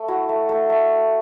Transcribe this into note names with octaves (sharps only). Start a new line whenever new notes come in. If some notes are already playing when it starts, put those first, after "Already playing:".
Already playing: A3
E4 F#4
A3
A3
A3